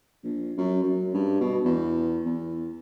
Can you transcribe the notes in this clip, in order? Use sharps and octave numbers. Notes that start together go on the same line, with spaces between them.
A#1
F#2
F#2
G2
B2
E2
E2